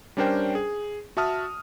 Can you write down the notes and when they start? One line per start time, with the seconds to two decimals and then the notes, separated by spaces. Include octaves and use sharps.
0.17 G3 C#4 D4 A#4 C5 G5
0.55 G#4
1.17 F#4 E5 A5 D#6 F6